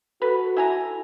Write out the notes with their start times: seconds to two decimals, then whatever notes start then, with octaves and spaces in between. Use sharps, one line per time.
0.22 F#4 A4 B4
0.57 E4 G#5 A#5